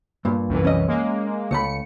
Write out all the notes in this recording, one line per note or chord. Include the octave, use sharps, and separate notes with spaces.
G2 A#2
C2 F#2 E3
C#4 D#5
G#3 A#3
C#2 A3 B5 C#7